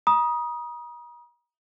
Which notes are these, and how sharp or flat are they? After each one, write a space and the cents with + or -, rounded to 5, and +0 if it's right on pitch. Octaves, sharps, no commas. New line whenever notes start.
A#5 +45 D#6 +0